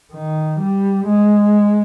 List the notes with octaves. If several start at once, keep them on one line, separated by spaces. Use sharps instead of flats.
D#3
G3
G#3